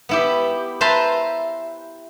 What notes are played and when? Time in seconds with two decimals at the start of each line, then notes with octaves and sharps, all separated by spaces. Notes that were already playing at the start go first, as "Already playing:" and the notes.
0.09 B3 E4 G4
0.81 B4 C5 E5 A5 A#5 C6